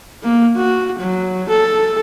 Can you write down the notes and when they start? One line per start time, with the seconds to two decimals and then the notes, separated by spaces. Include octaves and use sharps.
0.23 A#3
0.56 F#4
0.99 F#3
1.49 A4